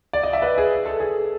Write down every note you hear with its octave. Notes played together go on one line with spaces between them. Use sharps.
D5
D#5
E5
B4
G#4
A4
G#4